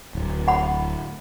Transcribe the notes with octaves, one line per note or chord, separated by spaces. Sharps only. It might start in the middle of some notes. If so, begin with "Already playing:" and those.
D1
F#5 B5